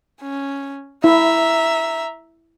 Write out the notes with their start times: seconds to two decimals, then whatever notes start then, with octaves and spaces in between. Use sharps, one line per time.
0.21 C#4
1.04 E4 E5 A#5